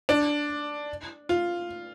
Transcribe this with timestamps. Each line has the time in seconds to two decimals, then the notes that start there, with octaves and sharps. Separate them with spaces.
0.09 D4
1.29 F4